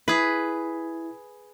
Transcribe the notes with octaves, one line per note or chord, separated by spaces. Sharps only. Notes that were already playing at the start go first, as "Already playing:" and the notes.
E4 G#4 B4